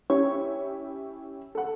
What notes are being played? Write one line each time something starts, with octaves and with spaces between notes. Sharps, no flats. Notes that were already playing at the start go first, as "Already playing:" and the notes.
C#4 E4 G4 C#5
A4 F#5